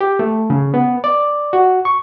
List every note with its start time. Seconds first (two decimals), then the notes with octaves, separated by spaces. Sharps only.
0.01 G4
0.19 A3
0.50 C#3
0.74 B3
1.04 D5
1.53 F#4
1.85 C#6